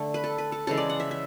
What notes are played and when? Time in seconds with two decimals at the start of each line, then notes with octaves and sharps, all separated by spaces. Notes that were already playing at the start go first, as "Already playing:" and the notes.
Already playing: D3 A3
0.14 B4
0.24 A4
0.38 B4
0.52 A4
0.67 C#3 E3 G#3 A4
0.78 D5
0.90 F#5
1.00 E5
1.11 E5